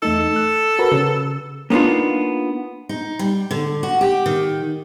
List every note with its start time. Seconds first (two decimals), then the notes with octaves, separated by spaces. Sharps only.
0.03 E2 A3 D#4 A4
0.36 F#6
0.79 F#4 A#4 B4
0.92 C#3
1.70 A#3 B3 D4 D#4 F4
2.89 D#4
3.19 G3
3.51 D3
3.83 F#4
4.01 G4
4.26 D#3